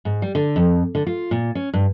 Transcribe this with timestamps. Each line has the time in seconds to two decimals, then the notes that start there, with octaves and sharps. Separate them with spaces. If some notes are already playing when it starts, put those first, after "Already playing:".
0.05 G#2
0.22 G3
0.35 D3
0.56 F2
0.95 D3
1.06 F4
1.31 A#2
1.55 C#4
1.73 G2